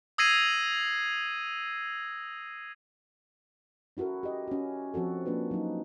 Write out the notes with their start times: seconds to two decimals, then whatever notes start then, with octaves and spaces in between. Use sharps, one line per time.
0.18 D#6 E6 G#6 A#6 C7 D#7
3.97 C#4 E4 F#4 A4 A#4
4.23 G4 D#5
4.48 C#4 F#4
4.94 F3 C4 F#4 A4
5.26 F3 A#3 C#4 D4 F4 B4
5.51 F#3 D#4